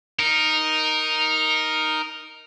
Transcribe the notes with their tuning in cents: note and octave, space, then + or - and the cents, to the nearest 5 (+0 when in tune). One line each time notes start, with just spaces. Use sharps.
D#4 +0 A#4 +0